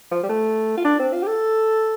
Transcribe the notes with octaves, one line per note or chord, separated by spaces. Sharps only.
F3
G3
A3
F4
D4
C4
F4
G4
A4